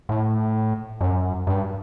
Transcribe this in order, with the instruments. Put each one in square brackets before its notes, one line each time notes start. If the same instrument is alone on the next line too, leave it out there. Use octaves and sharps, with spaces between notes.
[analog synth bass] A2
F#2
G2